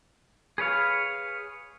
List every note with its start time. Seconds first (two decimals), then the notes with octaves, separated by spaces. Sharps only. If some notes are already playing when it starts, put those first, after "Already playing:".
0.58 G#4 B4 C#5 F5